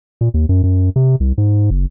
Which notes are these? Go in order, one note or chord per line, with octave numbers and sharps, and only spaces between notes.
A#2
D#2
F#2
F#2
C3
C2
G#2
F#1